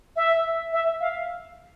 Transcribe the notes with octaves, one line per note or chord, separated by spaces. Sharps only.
E5
E5
F5